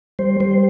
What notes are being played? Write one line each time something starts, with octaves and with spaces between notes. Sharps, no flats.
G3 C5
G3 C5